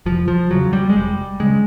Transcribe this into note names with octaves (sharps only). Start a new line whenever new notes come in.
F1 F3
F3
E2 C#3 F#3
G3
G#3
F1 G3
C#3 G#3